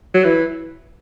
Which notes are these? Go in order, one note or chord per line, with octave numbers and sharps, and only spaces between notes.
F#3
E3